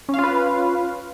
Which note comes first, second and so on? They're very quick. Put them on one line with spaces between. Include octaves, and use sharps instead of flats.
C#4 F5 F4 B4